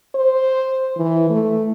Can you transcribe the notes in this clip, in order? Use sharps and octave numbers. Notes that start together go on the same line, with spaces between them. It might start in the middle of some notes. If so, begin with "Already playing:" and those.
C5
E3
A3